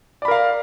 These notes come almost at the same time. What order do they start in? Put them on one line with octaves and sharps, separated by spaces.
D5 B5 A#4 F5